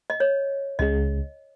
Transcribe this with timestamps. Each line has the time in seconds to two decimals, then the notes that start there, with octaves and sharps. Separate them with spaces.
0.10 D#5
0.20 C#5
0.79 C#2 C#3 G#3 D#5